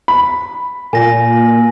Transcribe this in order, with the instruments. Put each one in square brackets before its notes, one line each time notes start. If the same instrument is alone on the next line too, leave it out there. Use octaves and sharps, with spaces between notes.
[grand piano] B5
[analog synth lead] A#2 [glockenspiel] G#5 A#6